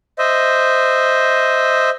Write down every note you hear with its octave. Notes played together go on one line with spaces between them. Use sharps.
C5 D#5 E5